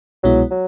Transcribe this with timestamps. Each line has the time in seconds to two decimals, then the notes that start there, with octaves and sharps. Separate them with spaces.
0.23 C2 B2 F#3 G#3 B3 E4
0.51 F#3